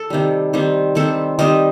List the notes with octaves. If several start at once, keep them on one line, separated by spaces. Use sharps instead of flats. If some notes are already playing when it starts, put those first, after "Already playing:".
Already playing: A4
C3 D#3 G3
D#3 G3 C4
D#3 G3 C4 A4
D#3 G3 C4 D#5